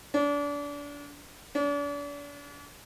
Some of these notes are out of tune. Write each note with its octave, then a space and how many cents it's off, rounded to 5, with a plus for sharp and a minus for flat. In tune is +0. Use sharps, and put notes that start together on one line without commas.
D4 -30
D4 -40